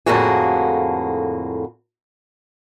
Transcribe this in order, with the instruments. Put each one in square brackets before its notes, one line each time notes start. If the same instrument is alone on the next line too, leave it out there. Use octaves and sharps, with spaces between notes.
[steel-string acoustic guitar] F2 A2 D3 A#3 F#4 G#4